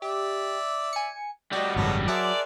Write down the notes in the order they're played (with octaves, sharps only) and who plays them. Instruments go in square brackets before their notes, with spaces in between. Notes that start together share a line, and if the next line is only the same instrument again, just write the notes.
[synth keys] G4 [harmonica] D5 E5
[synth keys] G#5 C#7
[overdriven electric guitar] G3 F#4 [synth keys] D5 D#5 [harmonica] G5
[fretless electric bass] G#1 F#2 C#3 [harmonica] B3 A4 C#5
[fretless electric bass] F#3 [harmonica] G#4 A#4 C5 [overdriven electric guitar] D5 [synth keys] E5 F#5 A5